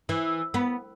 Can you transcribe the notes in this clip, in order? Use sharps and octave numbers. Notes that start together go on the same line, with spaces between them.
E3
B3